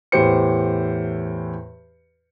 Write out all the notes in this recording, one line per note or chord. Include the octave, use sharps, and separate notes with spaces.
E2 A2 G4 C5 C#7